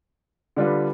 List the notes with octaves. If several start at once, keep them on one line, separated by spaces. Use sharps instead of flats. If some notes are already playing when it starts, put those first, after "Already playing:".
D3 G3 D4 F4 B4